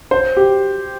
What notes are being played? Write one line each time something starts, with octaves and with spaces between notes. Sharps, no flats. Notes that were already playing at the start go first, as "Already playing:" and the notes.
C5
G4